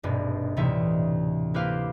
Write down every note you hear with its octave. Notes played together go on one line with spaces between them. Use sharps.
D#1 G#1 G2 B2
D2 A2 C3 E3 D#4 E5
A#3 E4 G4 B4 C5 F5